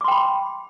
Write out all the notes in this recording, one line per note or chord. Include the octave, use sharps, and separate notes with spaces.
G5 B5 C6 D6